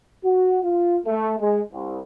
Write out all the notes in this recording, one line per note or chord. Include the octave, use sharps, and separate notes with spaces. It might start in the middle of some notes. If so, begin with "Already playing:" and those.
F#4
F4
A3
G#3
C2